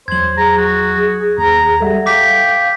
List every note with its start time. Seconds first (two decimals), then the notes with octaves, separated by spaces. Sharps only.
0.08 E2 F#3 C5 G#6 F#7
0.37 G#4 A#5
0.57 F#4
1.38 D#2 A#5
1.80 G3 A4 E5 F#5
2.06 F5 G5 D6 B6